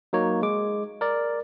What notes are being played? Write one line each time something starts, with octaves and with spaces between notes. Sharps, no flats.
F#3 A#3 D#4 C#5
G#3 D6
A#4 D5